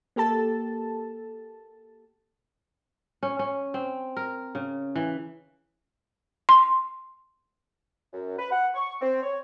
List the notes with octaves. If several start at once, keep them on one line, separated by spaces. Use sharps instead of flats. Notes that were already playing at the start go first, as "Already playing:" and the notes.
A#3 G4 A4 A5
C#4
C#4
C4
A#4
C#3
E3
C6
F#2
B4
F#5
C#6
C4
C#5